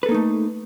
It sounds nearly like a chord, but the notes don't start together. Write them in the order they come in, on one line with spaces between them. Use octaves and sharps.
B4 A4 A#3 D#4 A3